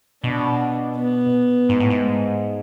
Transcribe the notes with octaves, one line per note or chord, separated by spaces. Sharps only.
B2 D4
B3
G#2
A2
G#2